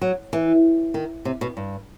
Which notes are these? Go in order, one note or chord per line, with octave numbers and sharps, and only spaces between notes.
F#3
E3
D#3
C3
B2
G2